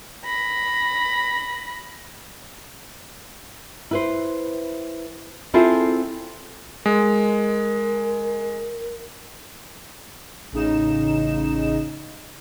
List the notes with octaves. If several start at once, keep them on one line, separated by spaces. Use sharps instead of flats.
B5 A#6
E4 B4 C5
C4 E4 F4 G#4 A4 C5
G#3 A#4
A1 C#3 D#4 E7